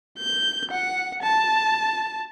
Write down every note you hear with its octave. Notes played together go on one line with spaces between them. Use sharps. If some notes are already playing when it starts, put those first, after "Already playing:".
G6
F#5
A5